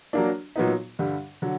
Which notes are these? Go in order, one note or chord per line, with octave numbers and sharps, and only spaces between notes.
F#3 A#3 D4
A#2 F#3 B3 D#4
G2 D3 G3
D3 F#3